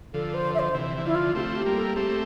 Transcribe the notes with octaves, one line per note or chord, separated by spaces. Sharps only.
D3 F3 A4
C5
E5
C5
C3 E3
E3
D3 F3 E4
F4
A3 C4 G4
F4
G4
G3 A#3
A4
A3 C4 G4